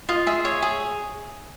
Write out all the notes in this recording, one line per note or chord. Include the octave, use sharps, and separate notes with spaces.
F4 D#5
G#4 E5
C#5
G#4